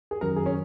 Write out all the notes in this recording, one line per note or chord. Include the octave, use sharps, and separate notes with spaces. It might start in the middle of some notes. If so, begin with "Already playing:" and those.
G#4
F#2 D#3 F#3 C#4 F#4 A#4
G#4
C#4